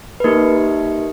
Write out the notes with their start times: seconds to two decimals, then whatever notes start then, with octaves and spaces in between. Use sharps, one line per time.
0.20 B4
0.24 A#3 D#4 G4 A#4